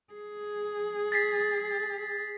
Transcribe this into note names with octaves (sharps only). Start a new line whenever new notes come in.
G#4
A6 B6 C7